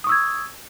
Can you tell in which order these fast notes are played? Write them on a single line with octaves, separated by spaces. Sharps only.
D#6 C#6 E6 G#6